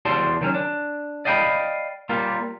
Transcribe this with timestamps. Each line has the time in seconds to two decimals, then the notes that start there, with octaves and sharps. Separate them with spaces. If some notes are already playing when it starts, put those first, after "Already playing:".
0.05 E2 F#4 G4 D5 A5 C6
0.41 D#3 F#3 C#4
0.54 D4
1.25 D5 D#5 F5 G5 G#5 B5
2.09 G3 A#3 F4